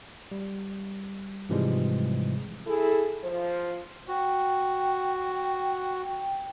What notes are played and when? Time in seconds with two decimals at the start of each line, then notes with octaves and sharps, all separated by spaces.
0.31 G3
1.49 G#2 C3 E3 F3 G3 G#3
2.67 E4 G#4 A4
3.23 F3 C5
4.08 F#4 G5